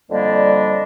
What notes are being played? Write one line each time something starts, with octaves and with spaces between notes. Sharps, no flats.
F2 D3 G3 A#3 D4 D#5